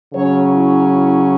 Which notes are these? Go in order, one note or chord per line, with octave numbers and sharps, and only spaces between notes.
C#3 F#3 C#4 C#5
E4
E4